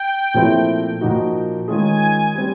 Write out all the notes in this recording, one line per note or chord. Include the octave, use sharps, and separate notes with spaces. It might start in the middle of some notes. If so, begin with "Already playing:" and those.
Already playing: G5
A#2 F3 A3 C4 E4
A#2 F3 A#3 D#4 F#4
D#3 G#3 C#4 F4 G#4 G#5
G3 C4